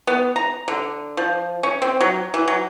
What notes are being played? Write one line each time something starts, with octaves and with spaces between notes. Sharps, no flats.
B3
A#5
D3
F3
C#4
C4
F#3
E3
F#3